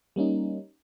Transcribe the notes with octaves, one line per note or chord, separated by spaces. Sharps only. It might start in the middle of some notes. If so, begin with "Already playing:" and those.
G3 A#3 C#4 D#4